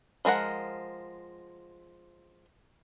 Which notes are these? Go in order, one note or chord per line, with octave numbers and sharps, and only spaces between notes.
F3 G#3 A#4 F#5